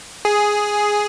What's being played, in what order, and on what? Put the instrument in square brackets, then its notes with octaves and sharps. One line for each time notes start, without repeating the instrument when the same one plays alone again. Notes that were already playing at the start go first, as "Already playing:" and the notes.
[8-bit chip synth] G#4